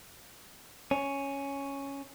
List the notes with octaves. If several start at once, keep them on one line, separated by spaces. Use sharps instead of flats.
C#4